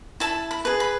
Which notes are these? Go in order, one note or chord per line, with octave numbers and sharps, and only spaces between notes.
E4 A5
B5
G#4 B4
B5